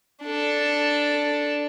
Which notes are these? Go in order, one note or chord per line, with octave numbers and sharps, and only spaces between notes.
D4 A4